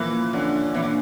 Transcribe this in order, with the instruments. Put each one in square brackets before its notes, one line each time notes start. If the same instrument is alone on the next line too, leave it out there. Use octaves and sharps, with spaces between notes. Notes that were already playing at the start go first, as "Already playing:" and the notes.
Already playing: [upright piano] A#2 F3 A#3 [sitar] E3
[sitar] D3 [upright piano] C#4
[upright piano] A#2 [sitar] E3
[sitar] D3